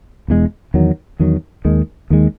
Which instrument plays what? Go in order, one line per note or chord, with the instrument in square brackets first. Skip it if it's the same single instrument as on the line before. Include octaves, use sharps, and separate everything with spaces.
[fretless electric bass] E1 E2 D#3 G#3
E2 D#3 F#3
E2 D#3 F#3
D#2 D#3 G#3
D#2 D#3 G#3